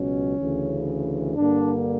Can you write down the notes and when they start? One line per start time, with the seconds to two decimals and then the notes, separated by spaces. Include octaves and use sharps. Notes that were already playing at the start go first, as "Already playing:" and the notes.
Already playing: C#2 B2 F#3 C#4
0.39 D2 C#3 E3
1.37 G2 D3 A#3 D4